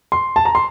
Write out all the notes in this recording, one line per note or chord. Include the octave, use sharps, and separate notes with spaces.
C6
A5
A#5
C6